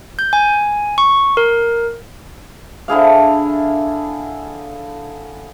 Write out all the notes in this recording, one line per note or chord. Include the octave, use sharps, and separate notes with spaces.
G6
G#5
C#6
A#4
D3 E4 G#4 F5